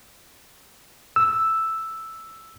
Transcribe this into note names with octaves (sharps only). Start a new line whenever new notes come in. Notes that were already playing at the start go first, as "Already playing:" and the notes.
E6